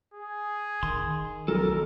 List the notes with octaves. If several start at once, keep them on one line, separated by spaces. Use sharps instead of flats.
G#4
D#3 C6
B1 A4 A#4